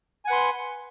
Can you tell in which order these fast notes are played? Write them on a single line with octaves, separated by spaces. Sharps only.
G#5 F#5 B4 C6